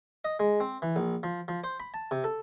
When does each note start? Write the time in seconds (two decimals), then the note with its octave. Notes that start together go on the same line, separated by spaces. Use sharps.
0.25 D#5
0.40 G#3
0.60 C4
0.82 E3
0.96 A#1
1.23 F3
1.48 F3
1.64 C5
1.80 B5
1.94 A5
2.11 C3
2.24 A4